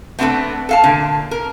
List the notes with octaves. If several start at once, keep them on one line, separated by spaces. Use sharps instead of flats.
A3 B3 C4 D4 A4 B4
A4 F5 A5
A#2 D3
A#4